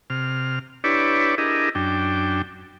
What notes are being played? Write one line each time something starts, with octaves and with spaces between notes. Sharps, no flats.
C3 F6
D4 E4 G4 B4 C#5 D5
D4 E4 G4 G#4 A#4 D#5
F#2 D4 G5